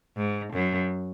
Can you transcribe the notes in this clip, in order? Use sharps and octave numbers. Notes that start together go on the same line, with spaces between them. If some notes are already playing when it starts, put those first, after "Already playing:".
G#2
F#2